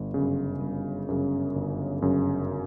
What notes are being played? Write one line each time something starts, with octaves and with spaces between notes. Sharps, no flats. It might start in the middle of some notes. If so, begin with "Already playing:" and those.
Already playing: G1
F#2 C#3
G1
F#2 C#3
G1
F#2 C#3